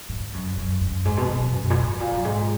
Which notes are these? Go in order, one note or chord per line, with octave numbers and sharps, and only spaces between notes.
G#2
F#2
F#2
F#2
G#2
B2
B2
B2
F#2
A#2
G#2
A#2
F#2
G#2